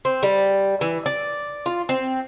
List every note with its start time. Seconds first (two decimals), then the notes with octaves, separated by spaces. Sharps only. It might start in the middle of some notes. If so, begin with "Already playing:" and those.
0.05 C4
0.23 G3
0.81 E3
1.06 D5
1.66 F4
1.89 C4